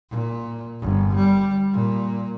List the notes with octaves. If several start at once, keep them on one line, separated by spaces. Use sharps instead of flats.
A#2
G1
G3
A#2